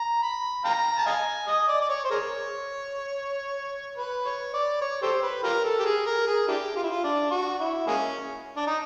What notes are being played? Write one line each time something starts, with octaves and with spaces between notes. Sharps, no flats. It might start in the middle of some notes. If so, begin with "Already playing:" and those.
Already playing: A#5
B5
F5 G5 A#5
A5
D#5 F5 G#5
D#5
D5
D5
C#5
C5
G#4 A#4 C#5
B4
C#5
D5
C#5
G4 A4 C5
B4
F4 G4 A#4
A4
G4
G#4
A#4
G#4
D4 E4 G4
F4
E4
F4
D4
F#4
E4
G#3 A#3 C#4
D4
D#4